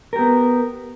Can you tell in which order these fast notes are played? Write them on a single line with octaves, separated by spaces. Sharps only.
A#4 G4 B3